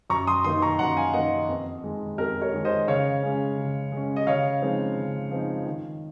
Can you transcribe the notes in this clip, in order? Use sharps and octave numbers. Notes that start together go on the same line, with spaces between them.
F#2 A#5 C#6
C6 D#6
D#3 A#3 D#4 C6 D#6
A#5 C#6
F#2 F#5 A#5
F5 G#5
D#3 A#3 D#4 D#5 F#5
F2
D#3 G#3
F2 A#4
A#4 C#5
D#3 G#3
C5 D#5
C#3 C#5 F5
G#3 C#4
C#3
G#3
C#4
D#5
C#3 C#5 F5
F3 G#3 C4 D#4
C#3
F3 G#3 C4 D#4
D#3